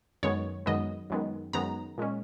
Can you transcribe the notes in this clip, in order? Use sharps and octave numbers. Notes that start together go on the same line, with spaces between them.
F#2 D#3 G#3 B3 C#5
F#2 D#3 G#3 B3 D#5
F#2 D#3 G#3 B3
F#2 D#3 G#3 B3 A#5
A#2 G#3 C#4